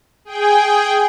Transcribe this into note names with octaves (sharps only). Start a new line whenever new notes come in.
G#4 G5